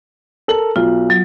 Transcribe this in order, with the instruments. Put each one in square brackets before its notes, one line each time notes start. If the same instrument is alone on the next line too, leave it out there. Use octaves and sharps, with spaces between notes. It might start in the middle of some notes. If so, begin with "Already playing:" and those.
[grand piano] A4 A#4 F#7
[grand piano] B1 [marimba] F4
[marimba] F#3